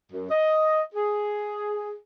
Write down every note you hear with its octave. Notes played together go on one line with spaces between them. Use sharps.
F#2
D#5
G#4